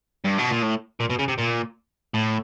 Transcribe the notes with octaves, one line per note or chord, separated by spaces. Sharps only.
G2
B2
A#2
A2
A#2
B2
C#3
C3
A#2
A2